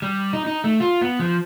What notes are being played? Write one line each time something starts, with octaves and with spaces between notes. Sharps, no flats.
G3
D#4
D#4
A3
F4
B3
F3